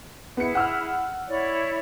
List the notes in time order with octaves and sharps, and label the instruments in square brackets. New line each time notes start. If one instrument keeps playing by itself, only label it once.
[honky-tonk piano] B3 C#7 [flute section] E4 G#4
[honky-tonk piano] F#5 E6 F6
[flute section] E4 C#5 D5